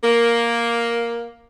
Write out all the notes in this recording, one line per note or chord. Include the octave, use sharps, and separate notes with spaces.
A#3